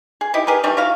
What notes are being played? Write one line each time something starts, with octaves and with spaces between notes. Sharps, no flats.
G#4
D#4 E4 G4
G4 G#4 A#4 B4
E3 G3 A3 D#4
E4 F#4 F5